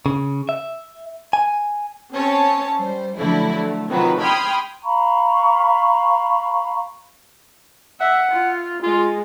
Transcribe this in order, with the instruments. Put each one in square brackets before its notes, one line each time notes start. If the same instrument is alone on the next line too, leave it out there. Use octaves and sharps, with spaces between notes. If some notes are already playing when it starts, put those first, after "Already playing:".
[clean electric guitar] C#3
E5
G#5
[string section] C4 C#4 C#5 A5
G3 C5
D3 F3 F#3 A3 E4
A3
C3 D#3 F3 F#3 C4 B4
G5 B5 C6 D#6 F6 G#6
[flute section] F5 A#5 B5 C#6
[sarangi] E5 [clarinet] F#5
[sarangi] F4
[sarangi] G#3 [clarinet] F4